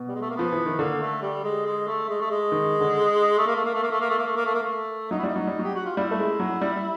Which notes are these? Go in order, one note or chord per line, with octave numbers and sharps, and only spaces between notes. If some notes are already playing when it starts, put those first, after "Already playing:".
Already playing: B2
G3
G#3
A3
A#3
F3 B3
E3
D#3
D3 A#3
A3
G3
G#3
G#3
A3
G#3
A3
G#3
D#3
D3
A3
A#3
A3
A#3
A3
A#3
A3
A#3
A3
A#3
A3
A#3
A3
A#3
A3
F#3 D#4
E4
G3 D#4
F#3
G3
F#3 G4
F#4
F4
G3 E4
A3
G#3
F#3
G3